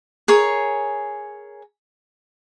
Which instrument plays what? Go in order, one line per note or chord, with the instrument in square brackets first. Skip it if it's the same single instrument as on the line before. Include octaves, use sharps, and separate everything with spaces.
[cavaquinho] G#4 A#4 C#5